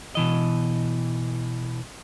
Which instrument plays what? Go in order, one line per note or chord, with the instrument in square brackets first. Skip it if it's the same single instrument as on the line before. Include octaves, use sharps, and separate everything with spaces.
[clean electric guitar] B2 E3 D#5